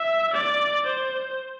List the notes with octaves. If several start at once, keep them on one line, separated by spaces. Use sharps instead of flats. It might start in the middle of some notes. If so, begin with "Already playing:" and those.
Already playing: E5
D5
C5